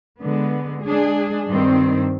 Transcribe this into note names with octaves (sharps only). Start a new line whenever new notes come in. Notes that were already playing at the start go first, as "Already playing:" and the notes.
D3 G#3 B3
G#3 D4 G#4
G2 D#3 G3 C4